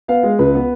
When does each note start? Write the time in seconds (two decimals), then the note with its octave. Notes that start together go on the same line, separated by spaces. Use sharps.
0.08 B3 F5
0.23 G#3
0.39 C#2 B4
0.54 B3